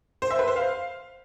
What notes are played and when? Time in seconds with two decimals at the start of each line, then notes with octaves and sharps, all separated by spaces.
0.22 C5
0.31 E5
0.39 B4
0.48 C5
0.56 F5